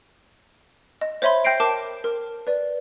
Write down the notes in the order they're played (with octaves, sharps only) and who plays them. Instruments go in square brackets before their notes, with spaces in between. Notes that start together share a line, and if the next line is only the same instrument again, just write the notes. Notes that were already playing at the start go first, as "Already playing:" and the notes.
[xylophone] D#5
C5 C#5 E5 B5 C6
G5 G6 A#6 C7 D7
A#4 A5 D6
A#4
B4 D5